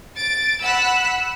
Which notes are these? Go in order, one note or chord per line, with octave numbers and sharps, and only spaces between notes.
A6 D7
F#5 B5 E6 F#6